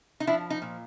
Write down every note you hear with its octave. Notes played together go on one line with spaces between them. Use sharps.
D#4
F3 D4 E4
D#4
A#2